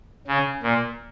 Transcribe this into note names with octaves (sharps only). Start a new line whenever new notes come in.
C#3
A#2